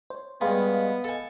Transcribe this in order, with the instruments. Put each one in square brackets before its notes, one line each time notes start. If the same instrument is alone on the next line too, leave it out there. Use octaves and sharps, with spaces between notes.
[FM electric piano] C5 C#5
[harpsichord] G2 G#3 [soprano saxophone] B3 [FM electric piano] D#5 F5 B5
[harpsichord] A4 G#5